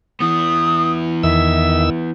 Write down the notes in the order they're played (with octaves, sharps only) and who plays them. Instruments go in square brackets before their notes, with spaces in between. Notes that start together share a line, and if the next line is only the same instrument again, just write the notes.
[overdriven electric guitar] E3 B3 [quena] D#6
[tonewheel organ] E2 D#3 E6 [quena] E5